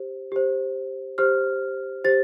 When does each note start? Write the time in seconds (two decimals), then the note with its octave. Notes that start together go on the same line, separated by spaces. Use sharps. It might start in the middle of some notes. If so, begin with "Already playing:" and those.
Already playing: G4 C5
0.32 G4 C5
1.18 G4 C5 F6
2.04 G4 C5 A6